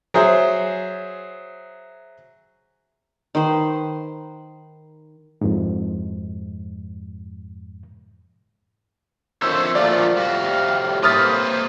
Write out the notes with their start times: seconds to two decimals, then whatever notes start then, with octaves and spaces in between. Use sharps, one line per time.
0.14 F#3 G#4 C5 E5
3.35 D#3 B4 C5
5.41 F2 G#2
9.42 D3 D#3 F3 A3 C4 C5 C#5 E6
9.75 A#2 D3 F3 F#3 A3 F4 D5
10.17 A2 C3 G3 F#4 F5
11.03 A#3 E4 B4 C5 D#6 F6 A6